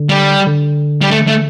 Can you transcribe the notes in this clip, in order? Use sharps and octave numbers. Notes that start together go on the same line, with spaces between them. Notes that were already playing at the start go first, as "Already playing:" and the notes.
Already playing: D3
G3
D3
G3
A3
A3